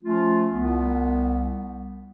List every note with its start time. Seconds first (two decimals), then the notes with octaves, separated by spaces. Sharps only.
0.04 F3 A3 C#4 F4
0.53 C2 B3